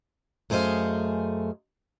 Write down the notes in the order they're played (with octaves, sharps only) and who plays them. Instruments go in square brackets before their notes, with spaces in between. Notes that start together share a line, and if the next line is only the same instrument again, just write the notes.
[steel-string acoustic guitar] F#2 A3 G#4 C5 D#5 F5